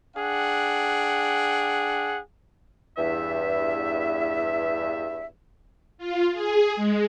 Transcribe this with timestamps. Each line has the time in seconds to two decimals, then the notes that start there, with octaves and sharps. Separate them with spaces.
0.16 D4 G#4 F#5 G5
2.98 E2 G2 E5
5.98 F4
6.33 G#4
6.76 G#3